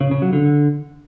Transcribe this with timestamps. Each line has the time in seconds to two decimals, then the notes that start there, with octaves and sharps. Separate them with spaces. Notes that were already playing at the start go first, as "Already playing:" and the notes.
0.01 C#3
0.11 C#3
0.22 F#3
0.33 D3